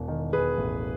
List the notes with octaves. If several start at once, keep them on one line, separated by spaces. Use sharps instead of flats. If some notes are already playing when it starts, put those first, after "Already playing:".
Already playing: E1
D#3
E1 G#4 B4
A1